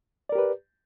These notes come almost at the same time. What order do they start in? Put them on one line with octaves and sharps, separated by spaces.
D5 A#4 G4 B4